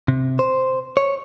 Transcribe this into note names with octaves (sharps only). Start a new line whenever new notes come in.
C3
C5
C#5